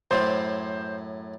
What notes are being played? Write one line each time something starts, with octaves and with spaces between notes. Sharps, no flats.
F#2 A2 C5